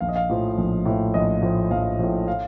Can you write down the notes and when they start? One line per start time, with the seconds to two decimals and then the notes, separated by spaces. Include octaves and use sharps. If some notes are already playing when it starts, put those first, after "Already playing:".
0.01 A#1 F5
0.09 D#5
0.16 F5
0.29 A2 F3
0.58 A#1
0.85 A2 F3
1.14 A#1 D#5
1.42 A2 F3
1.71 A#1 F5
1.99 A2 F3
2.28 F5